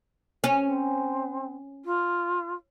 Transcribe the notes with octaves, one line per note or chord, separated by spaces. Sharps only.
C#4
C4
F4